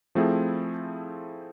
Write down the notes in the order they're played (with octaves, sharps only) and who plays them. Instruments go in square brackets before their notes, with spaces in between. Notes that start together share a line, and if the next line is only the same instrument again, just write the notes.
[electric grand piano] F3 A3 C4 E4 G#4